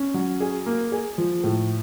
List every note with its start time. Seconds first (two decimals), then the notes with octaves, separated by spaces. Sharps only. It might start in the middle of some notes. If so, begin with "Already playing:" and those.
Already playing: C#4
0.14 F#3
0.40 G#4
0.66 A#3
0.92 G#4
1.18 F3
1.44 A2